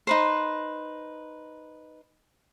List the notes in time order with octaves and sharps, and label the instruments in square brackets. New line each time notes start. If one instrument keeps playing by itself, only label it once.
[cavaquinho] D#4 B4 C5